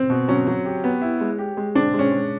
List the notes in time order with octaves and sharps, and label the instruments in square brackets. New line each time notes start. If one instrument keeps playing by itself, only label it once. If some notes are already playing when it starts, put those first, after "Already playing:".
Already playing: [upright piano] C4
[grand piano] B2
[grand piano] F#3 [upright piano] C#4
[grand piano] F#3
G4
B3
E4
G#3
G4
G#3
[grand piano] C4 [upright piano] D4
[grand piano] G#3
[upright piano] C#4
[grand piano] G#3